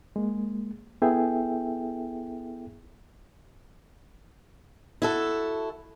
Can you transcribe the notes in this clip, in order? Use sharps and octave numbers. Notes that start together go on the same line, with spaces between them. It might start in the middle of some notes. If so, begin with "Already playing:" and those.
G#3 A#3
B3 E4 G#4 A4 E5 G5
E4 F#4 A4